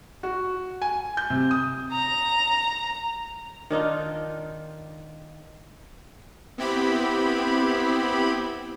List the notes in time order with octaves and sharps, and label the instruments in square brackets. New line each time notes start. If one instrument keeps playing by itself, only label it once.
[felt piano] F#4
G#5
G6
C3
D#6
[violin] A#5
[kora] D#3 D4 D#4 F4
[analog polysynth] B3 C4 E4 G4 B5